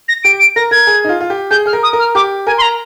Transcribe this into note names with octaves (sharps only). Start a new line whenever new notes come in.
A#6
G4 D7
D7
A#4 A#6
A#4 G#6
G#4
D#4
F4
F4
G4
G#4 G6
G#4 F6
A#4
D#6
A#4
F6
G4 D6
A#4 G#5
C6
A#5